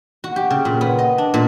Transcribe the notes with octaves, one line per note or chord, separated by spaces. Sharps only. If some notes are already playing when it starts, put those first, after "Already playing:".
F#4
G4
C#3
A#2
B3
D#5
D4
A#2